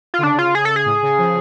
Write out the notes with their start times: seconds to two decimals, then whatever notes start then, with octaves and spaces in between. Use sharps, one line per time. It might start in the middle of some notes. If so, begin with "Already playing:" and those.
0.14 F4
0.18 D3
0.23 C#3 D4
0.39 F4
0.55 G#4
0.65 A4
0.76 G#4
0.86 A2
1.02 C#3
1.18 F3